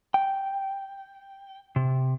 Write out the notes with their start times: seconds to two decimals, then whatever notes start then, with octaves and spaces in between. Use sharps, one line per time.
0.14 G5
1.76 C3